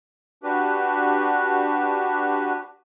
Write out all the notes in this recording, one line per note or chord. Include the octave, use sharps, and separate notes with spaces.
D4 F#4 G4 B4